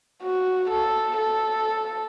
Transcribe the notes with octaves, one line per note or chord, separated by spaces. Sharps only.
F#4
A4
A4